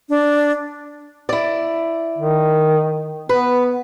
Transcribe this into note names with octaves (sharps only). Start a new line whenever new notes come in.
D4
E4 D5
D#3
B3 B4